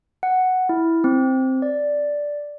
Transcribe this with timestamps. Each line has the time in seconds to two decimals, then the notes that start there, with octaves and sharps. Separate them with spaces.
0.23 F#5
0.69 E4
1.04 C4
1.62 D5